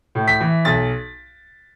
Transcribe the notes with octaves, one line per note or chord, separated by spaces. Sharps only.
A2
B6
E3
B1 A6